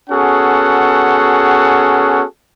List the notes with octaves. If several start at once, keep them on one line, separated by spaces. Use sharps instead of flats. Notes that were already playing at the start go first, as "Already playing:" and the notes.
B3 C#4 F#4 G#4 A4 F#5